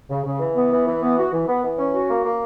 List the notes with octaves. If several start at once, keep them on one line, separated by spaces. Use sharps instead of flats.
C#3
C#3
E3
B3
E3
E3
B3
F#4
E3
B3
E3
C#4
F#4
A#3
A#3